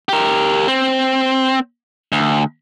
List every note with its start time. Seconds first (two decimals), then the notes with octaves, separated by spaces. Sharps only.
0.09 G4 A#4
0.68 C4
2.12 D2